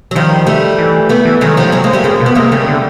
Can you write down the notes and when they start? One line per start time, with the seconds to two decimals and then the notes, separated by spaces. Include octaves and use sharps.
0.11 F#3
0.15 D#3 F3 G3
0.47 G3 A3
0.79 E3
1.09 A3 B3
1.25 E3
1.41 D#3 F#3 G#3
1.57 F3 G3
1.72 F#3 G#3
1.84 G#3 A#3
1.93 G3 A3
2.04 C#3 G#3 A#3
2.20 B2
2.26 B3
2.35 C3 G#3 A#3
2.52 C#3 G3 A3
2.68 D3